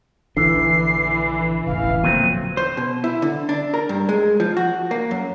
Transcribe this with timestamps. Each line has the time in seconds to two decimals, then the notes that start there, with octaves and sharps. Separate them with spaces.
0.37 A#1 D3 E3 D4 C7
1.67 E1 A1 C#3 F5
2.04 A#2 D3 F3 F#3 C4 D#7
2.57 C5
2.77 B2
3.04 E4
3.22 D3
3.49 D4
3.74 A#4
3.89 G2
4.09 G#3
4.40 F3
4.57 F#4
4.91 A#3
5.11 F#2